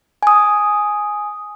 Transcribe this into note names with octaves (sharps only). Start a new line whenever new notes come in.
G#5 D#6